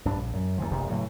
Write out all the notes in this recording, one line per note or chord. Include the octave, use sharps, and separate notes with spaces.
B1 G2 D4
A#1
F#2
D#2 E3 F3
F1 A#1 G2 C3
A2 C#3 E3 F#3